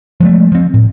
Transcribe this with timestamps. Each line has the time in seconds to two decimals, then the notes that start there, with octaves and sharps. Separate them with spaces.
0.20 F3 G#3 A3
0.52 F3 C4
0.74 A2